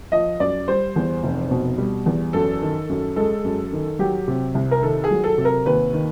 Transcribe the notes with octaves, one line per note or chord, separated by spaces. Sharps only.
F3 D#5
F#2 D5
G3 C5
E2
F1
B2
G3
E2
F#2 A4
D#3
F#2
G#3 A4
F#2
D#3
F#3 G4
C3
C2
A#4
D#3 A4
G#4
F#3
A4
C3
A#4
D#2 B4
D#3